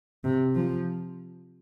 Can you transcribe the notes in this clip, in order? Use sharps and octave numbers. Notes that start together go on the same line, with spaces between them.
C3
F3